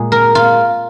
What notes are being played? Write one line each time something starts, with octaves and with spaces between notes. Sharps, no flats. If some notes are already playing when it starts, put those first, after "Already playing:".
Already playing: A#2 G#3 G#4
A#4
F4